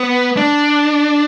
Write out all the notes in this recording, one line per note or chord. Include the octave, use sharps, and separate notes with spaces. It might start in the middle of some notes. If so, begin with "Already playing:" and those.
Already playing: B3
D4